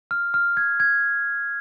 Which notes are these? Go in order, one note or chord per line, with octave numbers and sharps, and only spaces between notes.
F6
F6
G#6
G#6